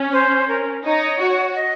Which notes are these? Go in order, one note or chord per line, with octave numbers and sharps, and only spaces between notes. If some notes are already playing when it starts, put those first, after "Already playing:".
Already playing: C#4
C5
A#4
D#4 C#5
F#4
D#5